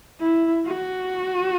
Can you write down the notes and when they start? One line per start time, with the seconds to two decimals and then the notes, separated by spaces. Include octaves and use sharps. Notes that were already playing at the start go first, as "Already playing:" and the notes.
0.20 E4
0.66 F#4